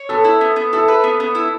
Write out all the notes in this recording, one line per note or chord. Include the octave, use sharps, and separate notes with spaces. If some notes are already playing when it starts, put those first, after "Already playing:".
Already playing: C#5
B3 A4
E4
B3
B3
E4 A4
B4
B3
B3
E4